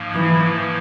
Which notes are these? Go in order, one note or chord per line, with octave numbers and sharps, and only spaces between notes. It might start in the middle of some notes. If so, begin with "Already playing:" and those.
Already playing: G#2 F3 A#3
E3